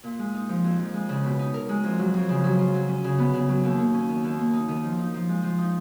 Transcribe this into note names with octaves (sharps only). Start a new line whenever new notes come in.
A#2
G#3
D#4
F3
F2
F3
G#3
C#3
B2
D#4
A#4
G#3
F2
F#3
F2
C#3
F#3
F4
F#3
C#4
C#3
B3
C#3
F#3
D#2
A#3
C#4
D#3
D#2
A#3
D#4
D#3
F3
D#4
F3
G#3
F3
D#4